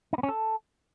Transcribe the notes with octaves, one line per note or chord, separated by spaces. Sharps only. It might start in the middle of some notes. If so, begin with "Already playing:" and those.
D#4
B3
C#4
A4